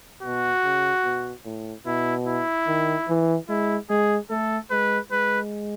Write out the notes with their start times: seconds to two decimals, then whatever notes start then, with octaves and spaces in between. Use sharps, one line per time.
0.23 B2 F#4
0.64 C#3
1.04 B2
1.45 A2
1.86 B2 E4
2.27 E4
2.67 D#3
3.08 E3
3.49 G#3 E4
3.90 G#3 G#4
4.30 A3 A4
4.71 G#3 B4
5.11 G#3 B4